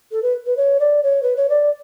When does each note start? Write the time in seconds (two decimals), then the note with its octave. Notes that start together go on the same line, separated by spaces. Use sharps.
0.12 A4
0.23 B4
0.46 B4
0.57 C#5
0.80 D5
1.03 C#5
1.23 B4
1.37 C#5
1.49 D5